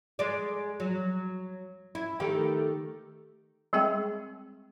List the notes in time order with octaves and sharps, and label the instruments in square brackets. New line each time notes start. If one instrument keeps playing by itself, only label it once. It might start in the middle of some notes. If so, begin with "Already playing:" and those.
[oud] G#3 D5
F#3
E4
D#3 A3 G4
[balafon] G3 G#3 C4 G#4 G5